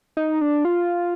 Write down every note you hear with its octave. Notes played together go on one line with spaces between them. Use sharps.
D#4
D4
F4